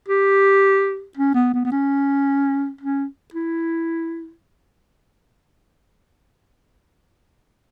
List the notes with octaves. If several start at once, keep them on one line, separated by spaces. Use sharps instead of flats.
G4
C#4
B3
B3
B3
C#4
C#4
E4